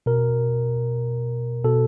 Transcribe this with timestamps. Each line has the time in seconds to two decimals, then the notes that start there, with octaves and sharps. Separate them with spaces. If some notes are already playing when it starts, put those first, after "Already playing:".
0.06 B2 A#4
1.64 B2 A4